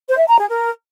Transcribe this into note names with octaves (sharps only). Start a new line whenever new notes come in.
C5
E5
A#5
G#4
A#4